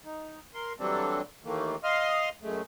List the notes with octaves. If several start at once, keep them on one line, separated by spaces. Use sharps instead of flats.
D#4
A#4 C6
E3 F#3 G3 C4 D4 A4
D#2 D#3 E3 A3 A#3
D#5 F5 C6 D#6 F6
F#2 G#3 A3